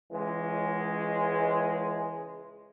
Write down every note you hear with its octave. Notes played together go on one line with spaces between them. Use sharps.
C#2 E3 G#3